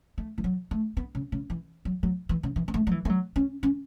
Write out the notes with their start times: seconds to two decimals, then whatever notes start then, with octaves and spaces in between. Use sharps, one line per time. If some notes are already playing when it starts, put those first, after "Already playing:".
0.18 A3
0.38 E3
0.44 F#3
0.71 A3
0.97 B3
1.15 C#3
1.32 C#3
1.50 E3
1.85 F#3
2.03 F#3
2.29 E3
2.43 C#3
2.56 E3
2.68 B3
2.74 A3
2.87 F#3
2.91 E3
3.05 A3
3.09 F#3
3.36 C#4
3.63 C#4